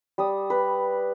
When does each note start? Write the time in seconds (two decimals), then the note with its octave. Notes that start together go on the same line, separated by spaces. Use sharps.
0.18 G3 D#6
0.50 B4